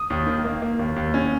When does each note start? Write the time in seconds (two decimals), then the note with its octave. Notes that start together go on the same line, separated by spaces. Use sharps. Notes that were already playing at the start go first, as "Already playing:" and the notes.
Already playing: D#6
0.10 D#2
0.26 D#3
0.45 A#3
0.62 A#3
0.79 D#2
0.96 D#2
1.14 C#4